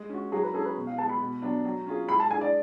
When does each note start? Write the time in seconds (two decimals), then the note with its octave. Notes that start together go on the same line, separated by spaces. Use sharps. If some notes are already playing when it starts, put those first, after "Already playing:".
Already playing: G#3
0.10 C#4 F#4
0.32 F#3 G#4
0.43 B4
0.54 C#4 G#4 A4
0.65 B4
0.75 B2
0.87 F5
0.98 G#3 B3 A5
1.09 B5
1.20 B2
1.42 F#3 B3 D4
1.65 F#3
1.86 C#4 F4 G#4
2.08 G#3 B5
2.20 A5
2.31 D4 G#4 G#5
2.41 D5